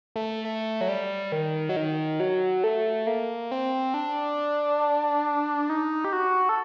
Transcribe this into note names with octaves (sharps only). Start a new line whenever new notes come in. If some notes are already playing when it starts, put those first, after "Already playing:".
A3
A3
F#3
G3
D#3
F#3
D#3
F#3
A3
A#3
C4
D4
D#4
G4
F#4
A4